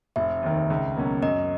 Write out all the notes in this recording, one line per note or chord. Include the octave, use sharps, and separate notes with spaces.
F1 E5
D#2 D#3
C#2
B2 F#3 A#3 C#4
F#2 D#5